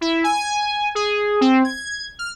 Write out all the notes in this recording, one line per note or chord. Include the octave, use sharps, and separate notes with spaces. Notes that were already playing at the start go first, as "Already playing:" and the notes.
E4
G#5
G#5
G#4
C4
G#6
F6